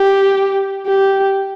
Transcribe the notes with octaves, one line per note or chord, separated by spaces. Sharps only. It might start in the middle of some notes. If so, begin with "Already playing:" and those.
Already playing: G4
G4